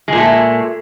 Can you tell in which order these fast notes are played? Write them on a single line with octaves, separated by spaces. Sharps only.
G#3 A#2 A3